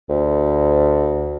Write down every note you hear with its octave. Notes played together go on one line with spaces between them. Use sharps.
D2